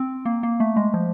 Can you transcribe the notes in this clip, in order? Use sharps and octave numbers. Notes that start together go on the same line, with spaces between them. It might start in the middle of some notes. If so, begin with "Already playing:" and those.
Already playing: C4
A#3
A#3
A3
G#3
F3